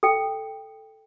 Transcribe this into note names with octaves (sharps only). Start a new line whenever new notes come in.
A4 G5